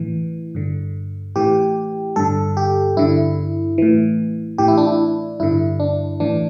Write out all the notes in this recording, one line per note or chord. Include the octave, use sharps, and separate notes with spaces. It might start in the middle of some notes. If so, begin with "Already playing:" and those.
Already playing: A2 E3
G2 D3
A2 E3 G4
G2 D3 A4
G4
G2 D3 E4
A2 E3
A2 E3 G4
E4
D4
E4
G2 D3 E4
D4
A2 E3 D4